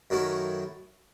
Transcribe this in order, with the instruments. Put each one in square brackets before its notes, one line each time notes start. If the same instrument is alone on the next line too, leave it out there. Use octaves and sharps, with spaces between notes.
[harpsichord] F#2 D#3 F#3 A3 E4